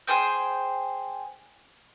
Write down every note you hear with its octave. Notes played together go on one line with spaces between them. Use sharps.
G#4 C5 G5